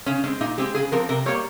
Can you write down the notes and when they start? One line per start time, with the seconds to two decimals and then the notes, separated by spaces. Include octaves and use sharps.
0.06 C#3 C#4
0.24 G#3 C4 C#4
0.41 A#2 D#4
0.58 G#3 C4 G4
0.74 C#3 G#4
0.92 F3 C4 A#4
1.09 C3 A#4
1.26 G3 A#3 C#5